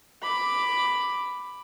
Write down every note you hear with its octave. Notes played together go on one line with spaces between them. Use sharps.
B5 D6